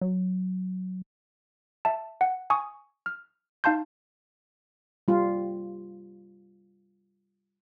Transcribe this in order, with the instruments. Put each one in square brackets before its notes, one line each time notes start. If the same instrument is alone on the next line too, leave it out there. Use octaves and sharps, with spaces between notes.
[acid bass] F#3
[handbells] E5 A5
F#5
G#5 C#6 D#6
F6
D#4 F5 A5 C6 G6
[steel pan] G3 F4